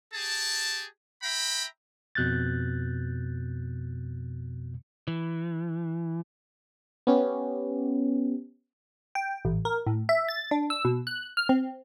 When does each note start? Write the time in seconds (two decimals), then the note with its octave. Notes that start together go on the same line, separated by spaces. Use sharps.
0.14 G4 G#4 A5
1.23 E5 G5 A#5 B5
2.15 F2 B2 F#6 G6 A6
5.08 E3
7.07 B3 C#4 G4
9.15 G5
9.45 A1
9.65 A#4
9.87 A2
10.09 E5
10.28 A6
10.51 D4
10.70 E6
10.85 B2
11.07 F#6
11.37 F6
11.49 C4